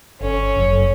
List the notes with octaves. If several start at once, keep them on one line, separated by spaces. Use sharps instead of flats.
G1 C#4 A4
F#1 F#2